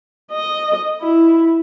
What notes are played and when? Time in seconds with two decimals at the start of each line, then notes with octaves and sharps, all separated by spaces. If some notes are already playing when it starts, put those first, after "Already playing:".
0.32 D#5
1.01 E4